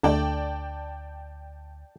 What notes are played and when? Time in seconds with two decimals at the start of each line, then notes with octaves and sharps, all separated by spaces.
0.03 D2 D3 A3 D5 G5 A5